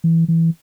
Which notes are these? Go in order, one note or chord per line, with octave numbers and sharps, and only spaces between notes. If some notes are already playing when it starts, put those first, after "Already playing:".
E3
E3